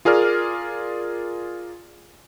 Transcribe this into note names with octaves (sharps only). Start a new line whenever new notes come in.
F4 G#4 A#4 D5 F6